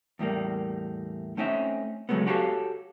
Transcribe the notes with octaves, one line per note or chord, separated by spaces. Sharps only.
E2 A2 G3 A#3
A3 C4 C#4 D#4 E5
C#3 F3 F#3 G#3 A3 B3
F#4 G4 A4 C#5 F5